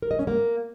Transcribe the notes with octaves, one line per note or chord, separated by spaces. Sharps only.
A#4
D#5
C#4
A#3